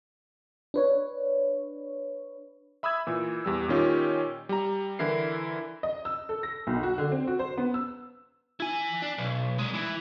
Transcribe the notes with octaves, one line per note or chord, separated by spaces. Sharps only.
D4 B4 C#5
E5 B5 D#6 E6 G#6
A#2 E3
E2 G3 E6
A#2 D#3 C#4 F4 G4
G3 A#5
D3 E3 E4 A#4 C7
D#5
E6
A4
A#6
B1
F#4
D3
C4
F#4
C5
B3
E6
E4 G#5
D4
B1
A#2 G#3
E3